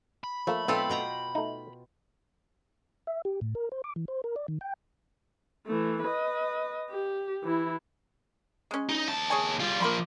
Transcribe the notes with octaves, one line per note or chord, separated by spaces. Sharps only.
B5
F3 A3 A#3 E5
B1 C4 F4 A4
B2 G5 A#5
A3 D#4
E5
G4
A2
A#4
C5
D6
E3
C5
A#4
D5
D#3
G5
E3 A3
B4 D#5
G4
E3 E4
G#3 C#4
D#4
D#2 A5
G#4 C#5 G#5
G3 F4
F3 A#3 A#4 B5 C6